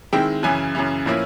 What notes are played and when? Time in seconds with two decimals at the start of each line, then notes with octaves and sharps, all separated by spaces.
0.13 D#3 G#3 C4 E4 G5
0.43 F#2 C#3 E3 G#5
0.75 F#2 C#3 E3
1.06 A2 F3 A#3 C#4 E4